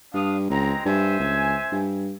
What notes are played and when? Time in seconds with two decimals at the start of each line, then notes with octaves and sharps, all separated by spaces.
0.14 G2 D4 F5 D#6
0.50 C#2 G#3 C4 A#5
0.86 G2 C5 E5 G#5
1.20 C#2
1.72 G2